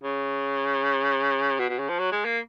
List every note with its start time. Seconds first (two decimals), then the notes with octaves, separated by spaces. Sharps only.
0.04 C#3
1.59 B2
1.69 B2
1.79 C#3
1.89 F3
1.99 F#3
2.12 G#3
2.25 A#3